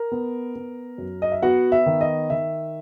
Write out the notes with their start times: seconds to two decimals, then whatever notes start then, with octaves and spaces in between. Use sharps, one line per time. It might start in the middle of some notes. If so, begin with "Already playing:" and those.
Already playing: A#4
0.12 B3
0.56 B3
0.98 F#2
1.22 D#5
1.32 E5
1.42 B3 F#4 F#5
1.72 E5
1.86 D#3
2.01 D#5
2.30 D#3 E5